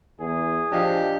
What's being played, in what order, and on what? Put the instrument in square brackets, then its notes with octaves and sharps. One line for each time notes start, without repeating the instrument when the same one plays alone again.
[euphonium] E2 [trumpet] G#4
[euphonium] F3 [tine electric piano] D4 D#5 F5 [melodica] G4